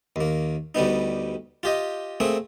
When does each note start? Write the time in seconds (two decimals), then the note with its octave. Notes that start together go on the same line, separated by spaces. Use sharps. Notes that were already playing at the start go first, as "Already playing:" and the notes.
0.16 D#2 A#3
0.75 D2 G3 B3 D#4
1.63 F4 G4 D#5
2.20 A3 A#3 C4 G#4